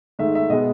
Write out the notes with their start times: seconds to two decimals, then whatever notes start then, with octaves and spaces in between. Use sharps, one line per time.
0.19 G#2 D#3 A3 E5
0.35 E5
0.50 B2 G#3 B3 D#5